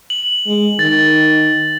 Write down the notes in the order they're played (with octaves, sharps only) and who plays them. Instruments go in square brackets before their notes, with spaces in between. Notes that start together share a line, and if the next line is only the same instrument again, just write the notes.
[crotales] F#7
[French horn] G#3
[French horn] D#3 [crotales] A6